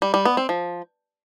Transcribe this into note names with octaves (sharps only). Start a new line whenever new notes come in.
G3
G3
B3
C4
F3